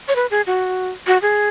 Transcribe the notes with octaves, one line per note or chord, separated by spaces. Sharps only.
C#5
B4
G#4
F#4
F#4
G#4